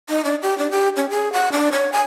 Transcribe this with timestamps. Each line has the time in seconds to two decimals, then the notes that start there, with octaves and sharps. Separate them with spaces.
0.09 D#4
0.25 D4
0.42 G4
0.58 D4
0.71 G4
0.96 C#4
1.10 G#4
1.33 F#5
1.52 D4
1.72 C#5
1.92 G#5